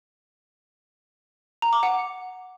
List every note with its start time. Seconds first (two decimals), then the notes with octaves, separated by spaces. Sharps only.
1.62 A#5
1.73 D6
1.83 F#5